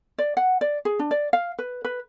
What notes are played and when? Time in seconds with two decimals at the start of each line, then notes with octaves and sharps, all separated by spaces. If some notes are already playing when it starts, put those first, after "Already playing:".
0.18 D5
0.37 F#5
0.61 D5
0.85 G#4
0.99 D4
1.11 D5
1.33 F5
1.59 B4
1.85 B4